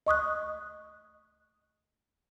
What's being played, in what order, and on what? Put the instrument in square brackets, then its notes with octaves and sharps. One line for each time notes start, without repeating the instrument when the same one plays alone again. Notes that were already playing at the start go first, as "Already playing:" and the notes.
[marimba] D#5 C#6 D#6 F#6